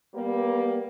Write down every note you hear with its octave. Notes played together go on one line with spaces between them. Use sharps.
G3 A#3 B3